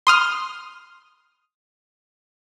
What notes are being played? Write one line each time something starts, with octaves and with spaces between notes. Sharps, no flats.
C6 D#6 F6